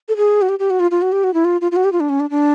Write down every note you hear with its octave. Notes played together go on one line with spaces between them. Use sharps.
A4
G#4
F#4
G4
G4
F#4
F4
F4
F#4
G4
F#4
E4
F4
F4
F4
F#4
G4
F4
D4
C#4
D4
D4